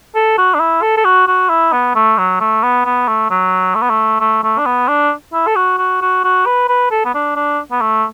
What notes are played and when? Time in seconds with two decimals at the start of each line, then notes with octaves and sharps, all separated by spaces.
0.15 A4
0.38 F#4
0.54 D4
0.60 E4
0.82 A4
0.97 A4
1.05 F#4
1.27 F#4
1.49 E4
1.73 B3
1.95 A3
2.18 F#3
2.40 A3
2.63 B3
2.85 B3
3.08 A3
3.30 F#3
3.75 A3
3.82 B3
3.90 A3
4.21 A3
4.43 A3
4.58 D4
4.66 B3
4.88 D4
5.33 E4
5.47 A4
5.56 F#4
5.78 F#4
6.01 F#4
6.24 F#4
6.46 B4
6.69 B4
6.91 A4
7.05 B3
7.14 D4
7.36 D4
7.71 B3
7.81 A3